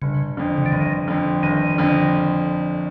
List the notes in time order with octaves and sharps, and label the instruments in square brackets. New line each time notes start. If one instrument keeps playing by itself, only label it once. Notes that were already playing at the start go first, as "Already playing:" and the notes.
[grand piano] G1 [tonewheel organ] C#3
[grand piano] F2 D3
[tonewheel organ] C#3
D3
[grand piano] G1 [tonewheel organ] D#3
[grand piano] F2 D3
[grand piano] G1 [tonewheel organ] D#3
[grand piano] F2 D3